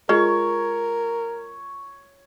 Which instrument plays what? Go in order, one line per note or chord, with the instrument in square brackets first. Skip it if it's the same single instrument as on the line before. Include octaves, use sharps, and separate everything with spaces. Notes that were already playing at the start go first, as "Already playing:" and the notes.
[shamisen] G#3 [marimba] F4 [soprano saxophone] A#4 [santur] C#5 C#6